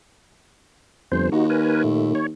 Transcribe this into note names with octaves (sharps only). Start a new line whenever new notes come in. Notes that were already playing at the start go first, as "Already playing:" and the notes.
G1 F2 C5
D#2 D#4 F#4
A#4 B4 G#5
A#2 A3
C#5